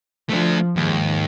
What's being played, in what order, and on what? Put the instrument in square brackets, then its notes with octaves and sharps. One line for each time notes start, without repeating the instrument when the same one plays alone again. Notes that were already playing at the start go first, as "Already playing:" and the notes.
[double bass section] F3 [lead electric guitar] A3 D4
[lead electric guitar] D#2 [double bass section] G#2